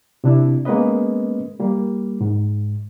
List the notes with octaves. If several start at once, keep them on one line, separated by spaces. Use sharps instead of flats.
C3 D4 E4
G#3 A#3 B3 C#4 B4 D#5
G3 A#3
G#2